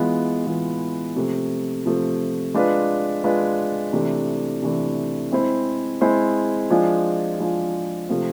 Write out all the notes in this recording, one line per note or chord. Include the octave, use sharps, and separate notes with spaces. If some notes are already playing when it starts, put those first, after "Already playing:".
Already playing: E3 G#3 B3 F4
E3 G#3 B3 F4
C3 F3 A3
C3 F3 A3
G#3 D4 F4 B4
G#3 D4 F4 B4
C3 E3 A3 D4
C3 E3 A3 D4
G#3 C4 E4 G#4 C5
G#3 C4 E4 G#4 C5
F3 G#3 D4 F4 G#4
F3 G#3 D4 F4 G#4
C3 F3 A3 C4 F4